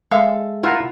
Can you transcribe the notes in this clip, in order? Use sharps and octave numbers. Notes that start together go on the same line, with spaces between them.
G#3 A4 E5 F5
E4 F4 A#4 F#5 A#5